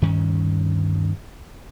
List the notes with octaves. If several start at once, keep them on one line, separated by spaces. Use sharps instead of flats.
D2 G2 D#3 C#4